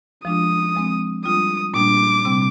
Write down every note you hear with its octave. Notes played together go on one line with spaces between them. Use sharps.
F3 G#3 D4 F4 D#6
F3 G#3 C4
G3 D4 F4 D#6
A#2 G3 A#3 D4 D6
C3 G3 C4